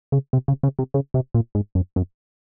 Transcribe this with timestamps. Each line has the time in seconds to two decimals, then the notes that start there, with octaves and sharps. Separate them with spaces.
0.12 C#3
0.33 C3
0.48 C#3
0.63 C#3
0.79 C3
0.94 C#3
1.14 C3
1.34 A#2
1.55 G#2
1.75 F#2
1.96 F#2